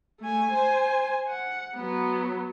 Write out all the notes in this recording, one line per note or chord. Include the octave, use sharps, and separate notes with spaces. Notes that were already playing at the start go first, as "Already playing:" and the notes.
A3 G#5
C5 G#5
F#5
F#3 B3